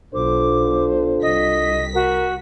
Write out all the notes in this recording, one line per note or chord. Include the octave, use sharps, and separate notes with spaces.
B1 D4 F4 A4 C5 D6
C2 D#5 B6
F#4 A#4